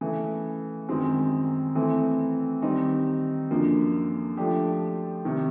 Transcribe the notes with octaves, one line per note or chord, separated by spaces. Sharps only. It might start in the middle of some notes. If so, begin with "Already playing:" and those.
C#3 E3 A3
F#2 D#3 G#3 C4
E3 A3 C4
D#3 G3 C4 D#4
F#2 D3 F3 A#3
F3 A3 D4 G4
C3 D#3